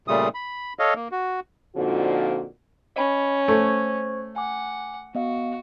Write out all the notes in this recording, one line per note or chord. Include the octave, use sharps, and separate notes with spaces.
A#2 C#3 G3 A3 D#6
B5
A4 C#5 D#5 F5
A#3
F#4
A#2 D3 F3 C4 D#4 F#4
C#4 D#5 B5
A3 C5 C#6 G#6
F#5 G#5 D6
B3 F#4 D#5 F5